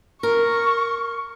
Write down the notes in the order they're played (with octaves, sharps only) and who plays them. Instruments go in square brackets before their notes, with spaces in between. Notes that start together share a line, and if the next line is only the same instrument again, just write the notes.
[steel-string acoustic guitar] A#4 [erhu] C#6